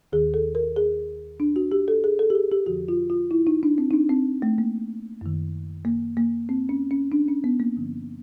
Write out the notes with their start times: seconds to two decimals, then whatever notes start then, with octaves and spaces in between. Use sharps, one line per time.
0.12 D#2 D#3 G#4
0.34 A4
0.55 A#4
0.76 G#4
1.40 D4
1.56 F#4
1.72 G4
1.88 A4
2.04 G#4
2.19 A4
2.30 G4
2.35 G#4
2.52 G4
2.66 F2 D3 F3 F#4
2.89 F4
3.10 F4
3.31 E4
3.47 D#4
3.63 D4
3.78 C4
3.91 D#4
3.94 D4
4.09 C4
4.42 A3
4.58 A#3
5.21 F#2 D#3
5.85 A#3
6.17 A#3
6.49 C4
6.69 C#4
6.91 C#4
7.12 D4
7.28 C#4
7.44 B3
7.60 A#3
7.76 G2 D3 F3